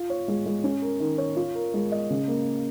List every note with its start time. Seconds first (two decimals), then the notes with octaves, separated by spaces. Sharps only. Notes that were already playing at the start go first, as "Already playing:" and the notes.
Already playing: F4
0.10 C#5
0.28 G#3
0.46 G#3
0.64 C#4
0.82 A#4
1.00 D#3
1.18 C#5
1.36 F4
1.55 A#4
1.74 G#3
1.92 D#5
2.10 C#3
2.28 A#3